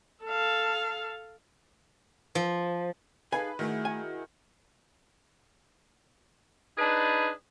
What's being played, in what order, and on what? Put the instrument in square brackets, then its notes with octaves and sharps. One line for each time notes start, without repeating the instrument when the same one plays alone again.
[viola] A4 F5
[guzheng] F3
[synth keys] D#4 G#4 A4 [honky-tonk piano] B4 [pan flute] F5 [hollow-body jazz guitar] G#5
[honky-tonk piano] D#3 [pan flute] A3 [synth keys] E4 F#4 G#4
[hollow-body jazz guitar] G#5
[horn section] D4 D#4 G#4 B4